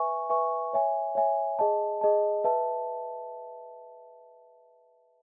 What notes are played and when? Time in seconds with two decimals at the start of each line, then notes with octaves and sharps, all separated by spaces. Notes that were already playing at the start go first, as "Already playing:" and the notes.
Already playing: B4 E5 G#5 C#6
0.30 B4 E5 G#5 C#6
0.73 C#5 E5 G#5
1.15 C#5 E5 G#5
1.59 G#4 D#5 A5
2.01 G#4 D#5 A5
2.44 B4 E5 A5